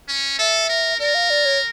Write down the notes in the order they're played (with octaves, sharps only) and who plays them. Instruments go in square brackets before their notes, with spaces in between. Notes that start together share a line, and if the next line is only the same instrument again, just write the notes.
[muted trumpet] C#4
[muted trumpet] A4 [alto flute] E5
[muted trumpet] A#4
[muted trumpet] A#4 [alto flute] D5
[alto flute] F5
D5
C#5